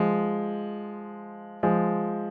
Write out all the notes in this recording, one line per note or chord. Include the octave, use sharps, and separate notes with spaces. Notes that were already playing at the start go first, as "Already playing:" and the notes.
Already playing: F3 G#3
F3 G#3